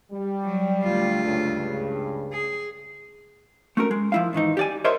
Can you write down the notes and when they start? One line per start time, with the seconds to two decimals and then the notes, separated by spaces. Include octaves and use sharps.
0.12 G3
0.43 F#3
0.84 D2 F4
1.25 C#2 G2 C#3
2.33 G#4
3.77 A3 C#4 F#4 A#4
3.91 G#3
4.12 F3 E4 F5
4.33 G#2 D#3 E3 D#4
4.57 G4 D5 G#5
4.84 A#4 C5 C#5 D#5 E5 C6